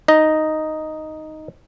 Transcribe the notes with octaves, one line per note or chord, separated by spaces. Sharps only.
D#4 D#5